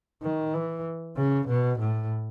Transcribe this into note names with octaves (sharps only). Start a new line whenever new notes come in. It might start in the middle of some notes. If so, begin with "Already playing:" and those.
D#3
E3
C#3
B2
A2